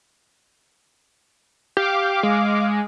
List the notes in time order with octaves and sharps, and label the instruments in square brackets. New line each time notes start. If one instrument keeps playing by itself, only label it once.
[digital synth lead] G4 [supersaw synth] F5 D6
[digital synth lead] G#3